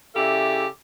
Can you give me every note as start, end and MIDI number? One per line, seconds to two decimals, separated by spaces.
0.15 0.66 49
0.15 0.66 64
0.15 0.66 67
0.15 0.66 69
0.15 0.66 74
0.15 0.66 76